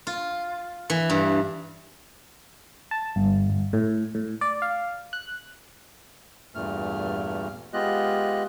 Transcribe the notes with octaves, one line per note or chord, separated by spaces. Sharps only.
F4
E3
G2
A5
G1
G1
A2
A2
D5
F5
F#6
E2 G2 A#2 A3 F6
G#3 B3 F4 G4 D#5 F#6